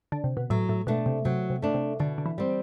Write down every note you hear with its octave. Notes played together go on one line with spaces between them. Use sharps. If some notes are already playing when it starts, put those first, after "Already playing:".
D3
C3
B2
A2 F#3
A2
B2 A3 D4
C3
C3 F#3
C3
A3 D4
C3
B2 D3
D3
E3
G3 C4